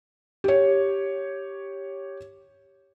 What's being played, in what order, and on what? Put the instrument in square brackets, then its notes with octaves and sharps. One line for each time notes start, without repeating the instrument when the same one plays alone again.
[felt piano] G4 C#5